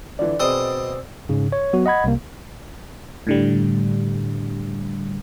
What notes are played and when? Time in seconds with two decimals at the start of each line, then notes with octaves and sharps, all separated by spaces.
0.19 D3 E3 D5
0.40 B2 C4 G#4 C5 D5 D#5 E6
1.29 G#2 C#3
1.52 C#5
1.73 F#3 B3 F#4
1.86 D#5 F#5 B5 G#6
2.04 C2 C3 A#3
3.27 A2 D3 G3